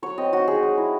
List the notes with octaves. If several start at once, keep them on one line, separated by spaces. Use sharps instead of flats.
F#3 C#5
C4 D#5
D#4 F#4
D#4 G#4
G#3
E4